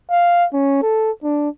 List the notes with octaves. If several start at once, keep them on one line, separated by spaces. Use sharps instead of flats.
F5
C#4
A4
D4